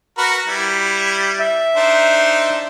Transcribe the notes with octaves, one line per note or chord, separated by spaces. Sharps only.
F#4 A#4 B4
G3 E4
E5
D4 D#4 C5